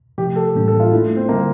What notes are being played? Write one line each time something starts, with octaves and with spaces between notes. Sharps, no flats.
C3 F3 A3 G4
A4
A2 E3 G3 A#3 D4
A4
F4
A3 D4 E4 A4
C4
D3 G3 A#3 C4